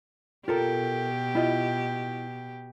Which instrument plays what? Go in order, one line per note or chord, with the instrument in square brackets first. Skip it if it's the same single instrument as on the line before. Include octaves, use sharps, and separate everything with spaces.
[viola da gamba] B2 G4 [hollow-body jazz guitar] F4 A4 A#4
[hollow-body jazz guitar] E4 F4 D#5